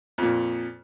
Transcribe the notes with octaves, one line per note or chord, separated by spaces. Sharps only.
F2 A#2